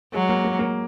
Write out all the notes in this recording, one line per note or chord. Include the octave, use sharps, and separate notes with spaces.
F#3 G#3
A#3
A#3
A#3